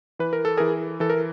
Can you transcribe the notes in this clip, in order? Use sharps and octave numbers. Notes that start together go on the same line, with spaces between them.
E3 B4
A#4
A4
E3 G#4 A#4
E3 A4
A#4